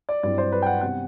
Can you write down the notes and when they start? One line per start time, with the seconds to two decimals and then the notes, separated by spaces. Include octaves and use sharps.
0.09 D5
0.23 G2 F#3 C4 E4 D5
0.38 C5
0.52 B4
0.62 G5
0.66 F#5
0.81 C3 G3 B3 F#5